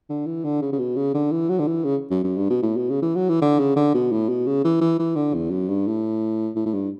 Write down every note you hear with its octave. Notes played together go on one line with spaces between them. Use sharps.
D3
E3
D3
C#3
C#3
B2
C#3
D3
E3
F#3
D3
E3
C#3
F#2
F#2
G2
B2
A2
B2
C#3
E3
F#3
E3
D3
C#3
D3
B2
A2
B2
C#3
E3
E3
E3
D3
E2
F#2
G2
A2
A2
A2
G2